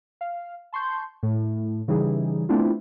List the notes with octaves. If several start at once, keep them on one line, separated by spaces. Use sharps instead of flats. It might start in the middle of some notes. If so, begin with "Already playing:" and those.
F5
A5 C6 C#6 G6
A2
C#3 E3 G3 D#4 G#4
A3 B3 C4 D4 E4 F4